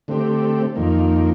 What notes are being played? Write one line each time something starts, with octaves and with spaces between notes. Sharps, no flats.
D3 A3 C4 G4
F2 D#3 A#3